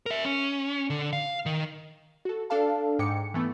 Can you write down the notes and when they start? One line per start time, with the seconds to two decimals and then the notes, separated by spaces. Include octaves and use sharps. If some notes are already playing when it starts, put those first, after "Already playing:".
0.06 A#4 E5
0.25 C#4
0.90 D3
1.13 F5
1.46 D#3
2.25 F#4 A4
2.50 D4 A4 D5 F5 A5
2.99 G#2 G5 D6 C#7
3.34 E3 A3 B3